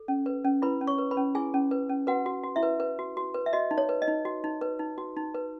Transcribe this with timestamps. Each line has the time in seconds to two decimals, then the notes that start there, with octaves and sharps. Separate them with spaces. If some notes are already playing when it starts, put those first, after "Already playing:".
Already playing: A4
0.08 C#4
0.26 B4
0.45 C#4
0.62 E4 B4 B5
0.81 C#4
0.87 C#5 C#6
0.98 B4
1.11 B4 B5
1.17 C#4
1.35 E4 G#4 G#5
1.54 C#4
1.71 B4
1.89 C#4
2.07 F#4 B4 F#5
2.26 F#4
2.43 F#4
2.56 E4 E5
2.63 B4
2.80 B4
2.99 F#4
3.17 F#4
3.34 B4
3.46 E5
3.53 F#4 D#5
3.71 D#4
3.78 C#5
3.89 B4
4.02 D#5
4.08 D#4
4.25 F#4
4.44 D#4
4.61 B4
4.79 D#4
4.98 F#4
5.17 D#4
5.35 B4